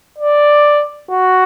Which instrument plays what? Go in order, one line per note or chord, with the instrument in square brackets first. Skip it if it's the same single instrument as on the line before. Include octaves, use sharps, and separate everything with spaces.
[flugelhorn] D5
F#4